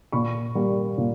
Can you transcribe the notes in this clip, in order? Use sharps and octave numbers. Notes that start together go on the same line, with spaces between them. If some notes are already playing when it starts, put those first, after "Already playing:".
A#2 B5 C#6
G3 A#3
A#2